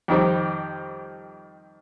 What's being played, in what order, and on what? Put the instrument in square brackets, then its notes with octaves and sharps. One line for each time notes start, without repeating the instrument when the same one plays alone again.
[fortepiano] F2 D#3 G3 C4